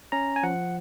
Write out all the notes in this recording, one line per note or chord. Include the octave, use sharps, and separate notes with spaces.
C#4 A#5
G#5
F3 F#5